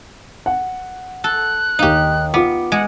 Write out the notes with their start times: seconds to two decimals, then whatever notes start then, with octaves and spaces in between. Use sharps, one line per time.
0.46 F#5
1.24 A4 F#6
1.79 D#2 D#4 G4 F5
2.34 B3 F4 D6
2.72 G#3 F#5